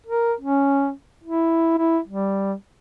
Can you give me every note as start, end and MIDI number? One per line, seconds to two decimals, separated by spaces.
0.06 0.33 70
0.41 0.91 61
1.24 1.76 64
1.78 1.99 64
2.08 2.53 55